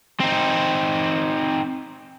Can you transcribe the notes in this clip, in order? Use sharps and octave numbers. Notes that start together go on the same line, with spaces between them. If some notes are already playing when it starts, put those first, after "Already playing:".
C4 D#4